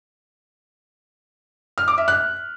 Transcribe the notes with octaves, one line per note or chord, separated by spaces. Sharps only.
F6
D6
E5
F#6